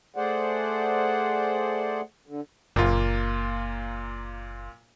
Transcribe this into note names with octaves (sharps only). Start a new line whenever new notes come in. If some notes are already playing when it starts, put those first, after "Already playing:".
A3 G#4 C5 D5 F#5
D3
F#1 A#2 A#3 F4